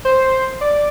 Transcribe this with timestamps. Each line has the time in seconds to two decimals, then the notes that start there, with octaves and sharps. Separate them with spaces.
0.05 C5
0.61 D5